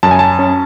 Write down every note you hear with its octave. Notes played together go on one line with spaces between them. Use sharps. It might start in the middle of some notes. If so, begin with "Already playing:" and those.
F#2 A5
G#5
A5
C#4